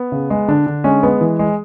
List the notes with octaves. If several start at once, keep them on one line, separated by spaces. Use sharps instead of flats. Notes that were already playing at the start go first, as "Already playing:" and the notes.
Already playing: B3
C#3
G#3
D3 D4
D3
G#3 C#4
G#3 B3
E3
G#3